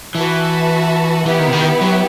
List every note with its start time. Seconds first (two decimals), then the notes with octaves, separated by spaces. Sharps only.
0.15 E3 F#4 B4 E5 A5
1.25 E3 B3 E4 G4 B4 E5
1.39 D#3
1.48 C3
1.53 D#3
1.81 F#3